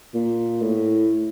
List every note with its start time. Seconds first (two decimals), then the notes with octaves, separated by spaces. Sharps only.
0.14 A#2
0.61 A2